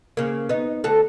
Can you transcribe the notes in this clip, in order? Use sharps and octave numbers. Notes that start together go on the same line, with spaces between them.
C#3 A#3
B3 D#4
D2 F#4 A4